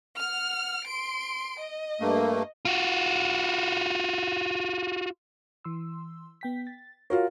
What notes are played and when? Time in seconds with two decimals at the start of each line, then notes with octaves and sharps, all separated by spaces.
0.20 F#5 F6
0.88 C6 D7
1.60 D#5
2.00 G2 A3 A#3
2.65 F4 F#4
5.65 E3 C6 E6
6.41 B3 G5 B6
6.67 A6
7.10 F4 F#4 A#4 C#5